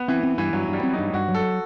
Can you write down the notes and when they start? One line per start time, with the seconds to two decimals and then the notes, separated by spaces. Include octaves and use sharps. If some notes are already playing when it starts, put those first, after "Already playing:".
Already playing: B3
0.08 E3 C4
0.23 C4
0.38 G2 E3
0.53 G2 F#3
0.68 G2
0.73 G3
0.83 C4
0.93 D#4
0.99 G2
1.13 G2 F#4
1.28 F#3
1.34 A4